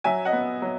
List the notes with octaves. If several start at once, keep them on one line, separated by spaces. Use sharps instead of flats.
F#3 E5 G#5
D#5 F#5
B3
F#3